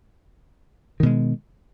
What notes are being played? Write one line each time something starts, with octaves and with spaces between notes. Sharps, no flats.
B2 D#3 G#3